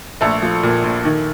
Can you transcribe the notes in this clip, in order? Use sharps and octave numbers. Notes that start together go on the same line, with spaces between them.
A#1 A3 A4
F3
A#2
A#1
D#3